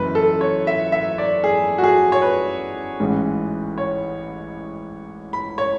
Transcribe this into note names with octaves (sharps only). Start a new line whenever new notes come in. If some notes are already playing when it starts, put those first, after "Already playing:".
Already playing: F#1 F#2 E3 B4
A4
C#5
E5
E5
D5
G#4
F#4
G#4
C#5
B4
A1 G#2 E3 G#3 C#4
C#5
B5
C#5